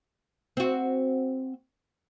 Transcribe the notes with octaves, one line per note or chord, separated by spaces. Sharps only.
C4 F#4